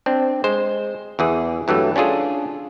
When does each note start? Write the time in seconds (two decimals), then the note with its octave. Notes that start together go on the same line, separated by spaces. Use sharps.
0.06 C4 D4
0.44 G#3 C5
1.19 E2 E3 G#4
1.68 G2 E3 F#3 A3
1.96 C#4 D4 F4 G#4 A4